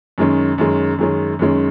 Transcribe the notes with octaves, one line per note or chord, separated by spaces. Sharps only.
F#2 D#3 G#3 C#4
F#2 D#3 G#3 C#4
F#2 D#3 G#3 C#4
F#2 D#3 G#3 C#4